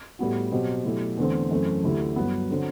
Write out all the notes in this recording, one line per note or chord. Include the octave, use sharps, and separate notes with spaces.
A2 G3 B3 F#4
B2 F#3 C4 G4
B2 F#3 A3 E4 G4
E2 D3 A3 C4
F#2 E3 A3 C4
D2 D3 A3 E4 G4
G2 F#3 B3
D3 F#3 C4